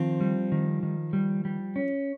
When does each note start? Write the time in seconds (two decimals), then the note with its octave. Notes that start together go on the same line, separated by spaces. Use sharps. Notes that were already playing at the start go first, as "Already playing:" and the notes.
Already playing: D#3 F3 C4
0.21 G3
0.52 D#3
0.83 D#3
1.13 G3
1.45 G3
1.76 C#4